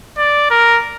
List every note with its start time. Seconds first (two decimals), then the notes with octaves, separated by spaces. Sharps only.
0.18 D5
0.50 A#4